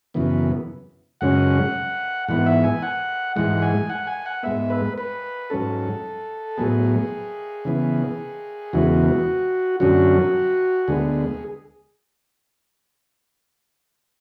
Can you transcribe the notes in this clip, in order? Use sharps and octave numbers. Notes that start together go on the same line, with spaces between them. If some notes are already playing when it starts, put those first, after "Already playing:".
F#2 C#3 E3 B3
F#2 C#3 G#3 C#4 F#5
G#2 E3 B3 F#5
E5
G#5
F#5
G#2 E3 G#3 F#5
G#5
F#5
G#5
F#5
G#2 G#3 B3 E5
B4
B4
G#2 F#3 C#4 A4
A2 F#3 B3 G#4
C#3 E3 B3
E2 C#3 E3 G#3 B3 F#4
F#2 D3 F#3 C#4 F#4
D2 D3 G#3 B3 G#4